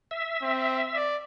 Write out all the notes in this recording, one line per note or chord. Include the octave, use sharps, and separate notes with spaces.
E5
C4
D5